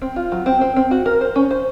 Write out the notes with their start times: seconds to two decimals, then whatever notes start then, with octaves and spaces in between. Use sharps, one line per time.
0.02 C4
0.16 F4
0.32 F#3
0.46 C4
0.61 C4
0.76 C4
0.91 F#4
1.06 A#4
1.21 C5
1.36 C#4
1.51 C5